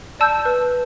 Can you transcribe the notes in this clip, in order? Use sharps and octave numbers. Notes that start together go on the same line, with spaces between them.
D5 A5 E6 G6
B4